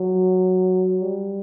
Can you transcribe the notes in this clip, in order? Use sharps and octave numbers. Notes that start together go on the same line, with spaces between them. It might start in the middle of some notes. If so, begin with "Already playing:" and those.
Already playing: F#3
G3